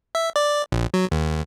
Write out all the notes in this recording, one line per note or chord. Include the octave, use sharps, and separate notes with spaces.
E5
D5
A#1
F#3
D#2